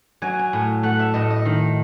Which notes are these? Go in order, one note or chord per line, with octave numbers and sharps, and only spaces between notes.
F#3 G#5
G#5
A2
A3 F#5
E5
A2 D#5
D#5
D#3